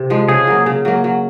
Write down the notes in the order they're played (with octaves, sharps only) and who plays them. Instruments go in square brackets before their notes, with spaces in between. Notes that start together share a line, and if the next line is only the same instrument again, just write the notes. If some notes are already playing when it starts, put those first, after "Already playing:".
Already playing: [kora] C3
F3 G#3
[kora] C#3 [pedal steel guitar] G#4
[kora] F#3 A#3
C#3
F#3 A#3
F#3